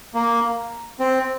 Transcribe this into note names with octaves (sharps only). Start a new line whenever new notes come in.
A#3
C4